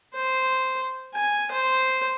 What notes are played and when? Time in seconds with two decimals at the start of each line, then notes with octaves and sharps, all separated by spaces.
0.15 C5
1.14 G#5
1.51 C5